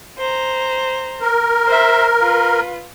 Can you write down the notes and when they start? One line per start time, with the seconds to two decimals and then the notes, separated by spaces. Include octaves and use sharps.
0.18 C5 A#5
1.22 A#4
1.67 C5 E5
2.19 F4 B4